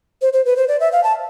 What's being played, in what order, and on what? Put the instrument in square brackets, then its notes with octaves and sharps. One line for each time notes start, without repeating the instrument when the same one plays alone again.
[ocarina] C5
C5
B4
C5
D5
E5
F5
A5